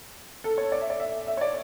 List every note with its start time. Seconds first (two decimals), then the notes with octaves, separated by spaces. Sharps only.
0.44 A4
0.58 C#5
0.72 D5
0.81 E5
0.90 D5
1.00 E5
1.27 E5
1.37 C#5
1.41 D5